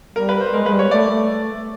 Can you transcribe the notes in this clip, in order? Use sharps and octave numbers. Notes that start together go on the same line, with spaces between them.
G3 A#4
B4
C5
G#3 A#4
G#3 B4
G3
C#5
A3 D5
A3